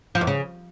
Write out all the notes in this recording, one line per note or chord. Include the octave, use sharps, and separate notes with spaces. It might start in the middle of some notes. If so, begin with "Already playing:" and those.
F3
E2
C#3